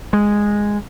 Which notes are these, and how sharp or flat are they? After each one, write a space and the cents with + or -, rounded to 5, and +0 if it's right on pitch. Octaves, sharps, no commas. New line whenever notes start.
G#3 -5